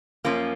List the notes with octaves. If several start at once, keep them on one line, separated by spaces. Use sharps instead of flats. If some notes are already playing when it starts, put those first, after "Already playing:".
F#2 F3 A#3 C#4 F4